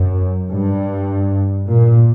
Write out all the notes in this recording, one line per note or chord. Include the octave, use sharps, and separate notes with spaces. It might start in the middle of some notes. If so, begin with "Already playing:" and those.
Already playing: F#2
G2
A#2